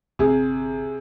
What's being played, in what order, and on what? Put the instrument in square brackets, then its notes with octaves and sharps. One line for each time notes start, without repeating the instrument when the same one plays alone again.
[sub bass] G1 [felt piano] C3 G#4